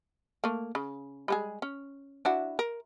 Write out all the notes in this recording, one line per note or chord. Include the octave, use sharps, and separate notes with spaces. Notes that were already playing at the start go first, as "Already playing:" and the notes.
A3 A#3
C#3
G3 G#3 G#4
C#4
D4 E4 F#4
A#4